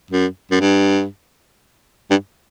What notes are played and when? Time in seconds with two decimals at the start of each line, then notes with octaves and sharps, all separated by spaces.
0.11 F#2
0.51 F#2
0.60 G2
2.10 G2